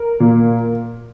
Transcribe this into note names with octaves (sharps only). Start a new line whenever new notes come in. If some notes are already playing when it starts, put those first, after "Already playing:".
Already playing: A#4
A#2